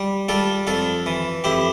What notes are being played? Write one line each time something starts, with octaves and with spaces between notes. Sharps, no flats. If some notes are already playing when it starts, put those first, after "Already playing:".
Already playing: G3
G3 F4 A4
F2 F4 A4
E3
F2 E4 G4